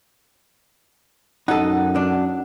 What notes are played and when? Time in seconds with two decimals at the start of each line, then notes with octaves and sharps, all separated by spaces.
1.48 F#2 D#4 A4 F#5
1.96 D4